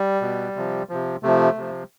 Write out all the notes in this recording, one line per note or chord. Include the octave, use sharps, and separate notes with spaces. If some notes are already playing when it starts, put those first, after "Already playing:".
Already playing: G3
B2
C3 F3
C3 F3
C3 F3 A3
C3 F3